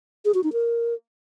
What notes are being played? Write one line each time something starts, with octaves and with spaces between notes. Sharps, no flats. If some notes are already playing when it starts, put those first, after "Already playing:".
G#4
F#4
D#4
A#4